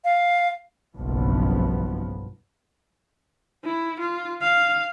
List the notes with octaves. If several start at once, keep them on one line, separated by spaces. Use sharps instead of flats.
F5
F#1 B1 G2 F3 B3
E4
F4
F5